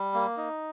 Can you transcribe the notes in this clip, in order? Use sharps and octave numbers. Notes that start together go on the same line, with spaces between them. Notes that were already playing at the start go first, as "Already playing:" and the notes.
Already playing: G3
A#3
D#4